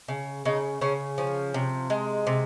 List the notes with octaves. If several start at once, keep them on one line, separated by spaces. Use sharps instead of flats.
C#3
C#3 D#4
C#3 C#4
F3 C#4
C3
G#3
C3